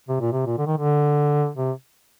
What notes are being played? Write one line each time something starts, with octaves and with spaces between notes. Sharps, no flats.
C3
A#2
C3
A#2
D3
D#3
D3
C3